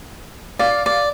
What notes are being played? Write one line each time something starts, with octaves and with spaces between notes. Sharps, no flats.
D5 F5
D5